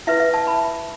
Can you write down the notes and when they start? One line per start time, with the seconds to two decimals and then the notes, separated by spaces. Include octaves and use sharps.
0.07 E4 B4 E5
0.20 E5
0.34 A5
0.47 B5